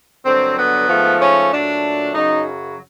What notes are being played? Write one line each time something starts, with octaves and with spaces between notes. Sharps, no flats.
G2 D3 F#3 C4
B3
G#2 F3 A3
C#4
A#2 F#3 A3 D4
F#2 C#3 F#3 D#4